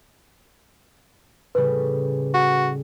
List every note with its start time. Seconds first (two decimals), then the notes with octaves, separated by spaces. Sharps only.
1.55 A2 C#3 G3 B4
2.34 F#4